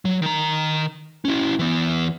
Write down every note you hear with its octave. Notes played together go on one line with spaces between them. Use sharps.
F#3
D#3 A#5
C#4 E4
E3 B3